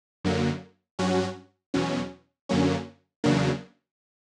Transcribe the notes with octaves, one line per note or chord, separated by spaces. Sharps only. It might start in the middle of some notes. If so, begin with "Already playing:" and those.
F#2 D3 F#3 A#3
G2 F#3 C#4 F#4
E2 B2 F#3 C#4
F#2 D3 F#3 A#3 C#4
E2 C#3 F#3 A#3 D4